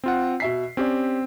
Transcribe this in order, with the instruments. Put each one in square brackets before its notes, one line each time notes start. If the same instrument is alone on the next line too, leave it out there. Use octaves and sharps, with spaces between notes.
[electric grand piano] C4 F4 F#5
[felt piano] B2 E5 B6 [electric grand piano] C7
[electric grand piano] C4 [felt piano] C#4 G4 D5